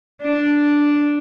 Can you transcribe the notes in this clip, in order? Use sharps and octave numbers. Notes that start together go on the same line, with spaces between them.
D4